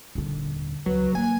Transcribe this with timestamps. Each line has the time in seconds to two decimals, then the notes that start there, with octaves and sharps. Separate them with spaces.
0.15 D#1 D3
0.86 C#2 F#3 B4
1.15 D#3 F#3 A#3 G#5